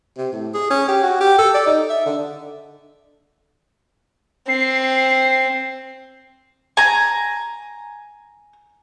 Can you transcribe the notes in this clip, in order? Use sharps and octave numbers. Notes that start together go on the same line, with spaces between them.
C3
A2
G#4
C#4
G4
F#4
G4
A4
D5
D#4
E5
D3
C4 C7
G#5 A#5